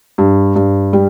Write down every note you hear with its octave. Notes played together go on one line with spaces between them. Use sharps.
G2
G2
G3